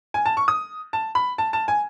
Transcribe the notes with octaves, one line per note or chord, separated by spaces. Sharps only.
G#5
A5
C#6
D#6
A5
B5
A5
A5
G#5